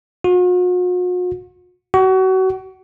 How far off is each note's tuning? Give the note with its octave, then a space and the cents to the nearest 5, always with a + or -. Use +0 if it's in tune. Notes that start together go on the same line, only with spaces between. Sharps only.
F#4 -45
F#4 +30